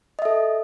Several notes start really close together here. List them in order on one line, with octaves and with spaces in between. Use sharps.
D#5 E5 A4